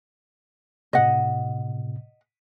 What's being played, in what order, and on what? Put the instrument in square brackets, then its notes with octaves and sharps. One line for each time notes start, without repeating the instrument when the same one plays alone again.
[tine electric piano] A2 C3 [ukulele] D#5 F#5